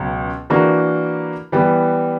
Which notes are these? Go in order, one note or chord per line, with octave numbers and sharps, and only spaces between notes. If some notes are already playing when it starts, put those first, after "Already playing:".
Already playing: C#2 B2 F#3
E3 A#3 D4 F#4
E3 G3 B3